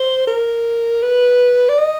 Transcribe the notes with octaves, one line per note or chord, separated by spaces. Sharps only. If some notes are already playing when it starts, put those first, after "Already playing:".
Already playing: C5
A#4
B4
D5
D#5